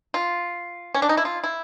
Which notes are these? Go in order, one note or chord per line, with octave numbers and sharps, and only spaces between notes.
F4
C#4
D4
D#4
E4
F4
E4